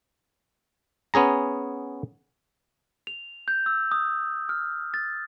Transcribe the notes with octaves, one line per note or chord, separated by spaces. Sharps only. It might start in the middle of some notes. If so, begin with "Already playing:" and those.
B3 C#4 G#4 A#5
F7
G6
E6
D#6
F6
A6